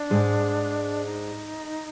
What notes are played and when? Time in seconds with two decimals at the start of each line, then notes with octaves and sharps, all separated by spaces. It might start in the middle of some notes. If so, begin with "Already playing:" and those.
Already playing: D4
0.10 G#2 G#3
1.05 D#4